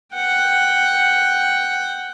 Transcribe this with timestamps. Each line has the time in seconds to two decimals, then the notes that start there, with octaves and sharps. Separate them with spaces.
0.15 F#5 G5